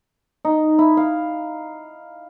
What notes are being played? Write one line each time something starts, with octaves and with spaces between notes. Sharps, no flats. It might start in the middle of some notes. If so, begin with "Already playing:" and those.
D#4
E4
F5